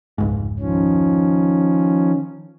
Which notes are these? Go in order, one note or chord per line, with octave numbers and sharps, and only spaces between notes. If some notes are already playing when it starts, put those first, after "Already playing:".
F1 C#2 G#2
D#3 F3 C#4